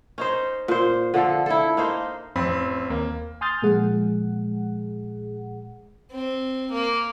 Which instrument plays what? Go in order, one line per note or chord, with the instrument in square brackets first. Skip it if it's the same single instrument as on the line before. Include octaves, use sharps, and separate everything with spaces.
[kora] C#4 D#4 C5
A#2 C5
D3 F3 A4
E4 A4
A#3 D#4 C5
[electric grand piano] A1 C4 B5 [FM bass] F2
[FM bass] D#2 [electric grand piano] A#3
[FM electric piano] G#5 C6 D#6 F6 G6 A6
A#2 F3 G#3 G#4 F#5
[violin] C4
A#3